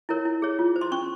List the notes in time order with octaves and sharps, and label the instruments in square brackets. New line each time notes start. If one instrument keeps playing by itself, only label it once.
[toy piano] E4 A#4 C#5
E4
G#4 C#5
F4
C5
C6
C#4 C#6